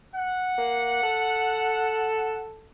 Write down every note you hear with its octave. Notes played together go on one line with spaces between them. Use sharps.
F#5
A#3
A4